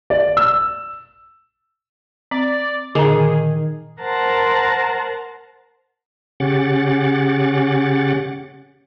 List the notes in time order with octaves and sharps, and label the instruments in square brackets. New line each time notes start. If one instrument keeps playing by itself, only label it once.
[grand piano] D5
E6
[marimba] C4 [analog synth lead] D5
[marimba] A#2 D3 [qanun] D#3 [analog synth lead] G#4
[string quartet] A#4 C5 F#5 A5 A#5
[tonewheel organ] C#3 C#4 G4 F#5 A6